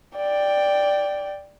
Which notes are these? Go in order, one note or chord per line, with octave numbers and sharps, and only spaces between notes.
D5 G5